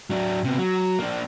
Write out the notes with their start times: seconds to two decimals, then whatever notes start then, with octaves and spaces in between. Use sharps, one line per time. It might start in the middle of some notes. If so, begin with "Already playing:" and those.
0.10 F#3 D4
0.44 C3 B3
0.59 F#3
0.99 A#3 D4